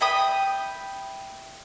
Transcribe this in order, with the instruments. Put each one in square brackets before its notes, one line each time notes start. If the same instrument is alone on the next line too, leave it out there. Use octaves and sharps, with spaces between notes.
[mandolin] E5 G5 B5 D#6